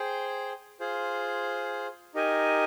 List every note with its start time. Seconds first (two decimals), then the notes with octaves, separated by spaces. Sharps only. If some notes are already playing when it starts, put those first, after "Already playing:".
Already playing: G#4 C5 G5
0.80 F4 G#4 C5
2.14 D#4 G4 A#4 D#5 G#5